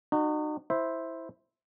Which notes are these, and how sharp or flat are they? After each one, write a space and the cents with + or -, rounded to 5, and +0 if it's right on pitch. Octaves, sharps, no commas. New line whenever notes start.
D#4 -40 F#4 +0
E4 -5 C5 +0 E5 -5